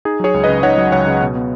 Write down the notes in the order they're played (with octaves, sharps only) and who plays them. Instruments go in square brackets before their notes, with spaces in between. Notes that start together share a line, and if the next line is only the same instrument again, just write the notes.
[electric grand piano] D#4 G#4
F#3 G#4 C#5
C#2
C#3 B4 D#5
D#4 C#5 F#5
F#3
C#2 C#5 F#5
C#3
B2
B3